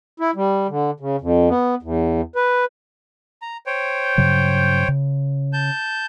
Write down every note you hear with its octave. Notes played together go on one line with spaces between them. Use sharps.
E4
G3
D3
C#3
F2
B3
E2
B4
A#5
C5 C#5 G5
G2 C#3 F#3
C#3
A5 G6